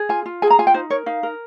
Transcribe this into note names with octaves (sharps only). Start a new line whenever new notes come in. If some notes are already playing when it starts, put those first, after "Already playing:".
Already playing: G#4
F4 G#5
F4
G#4 G#5
A#5
F4 G#5
G5
D#4 C5
A#4 C#5
D#4 F5
A#4